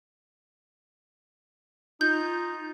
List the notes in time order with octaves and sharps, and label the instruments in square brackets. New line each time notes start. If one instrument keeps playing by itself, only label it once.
[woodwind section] D#4 F4 [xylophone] G6